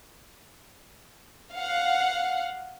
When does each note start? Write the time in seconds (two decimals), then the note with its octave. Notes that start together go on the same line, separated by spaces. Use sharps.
1.53 F5 F#5